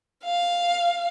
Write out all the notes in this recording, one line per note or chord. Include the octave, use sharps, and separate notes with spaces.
F5